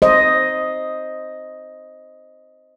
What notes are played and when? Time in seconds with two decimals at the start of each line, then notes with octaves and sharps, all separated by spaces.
0.02 C5 D#5